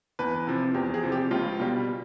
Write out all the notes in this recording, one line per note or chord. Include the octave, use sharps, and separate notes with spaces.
E2 B4
C3 F3
E2 G4
G#4
C3 F3
G4
C#2 F4
B2 G3